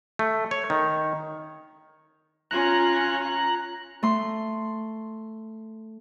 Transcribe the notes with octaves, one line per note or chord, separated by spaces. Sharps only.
A3
C#5
D#3
C#4 F4 A#5 F#6
A3 C6